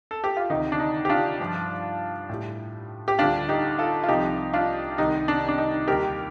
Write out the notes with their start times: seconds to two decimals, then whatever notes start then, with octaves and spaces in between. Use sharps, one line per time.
0.11 A4
0.24 G4
0.37 F4
0.50 D2 C3 D#3 D#4
0.72 D4
0.80 D#4
1.05 G4
1.09 D4 F4
1.40 G2 F3
2.29 A2 G3
3.08 G4
3.19 D2 D3 G3 D4 F4
3.49 D#4 G4
3.79 F4 A4
4.03 F4
4.08 C2 C3 F3 D#4 G4
4.53 D4 F4
4.98 C2 C3 D#3 G3 D#4
5.28 D4
5.48 D4
5.58 D#4
5.88 D#2 D#3 G3 G4 A#4